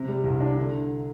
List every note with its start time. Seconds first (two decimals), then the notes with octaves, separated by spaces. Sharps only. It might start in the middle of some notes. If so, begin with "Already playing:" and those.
Already playing: C3
0.08 G3
0.24 C2
0.40 D4
0.57 D3